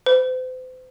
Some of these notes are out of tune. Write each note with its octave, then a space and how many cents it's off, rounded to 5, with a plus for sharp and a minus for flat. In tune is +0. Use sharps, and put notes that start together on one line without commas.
C5 -40